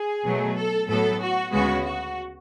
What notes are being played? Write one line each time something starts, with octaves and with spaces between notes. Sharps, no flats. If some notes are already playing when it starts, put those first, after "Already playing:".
Already playing: G#4
B2 F#3 A3
A4
A2 F#3 B3 A4
F#4
D2 C#3 G#3 B3 F#4
F#4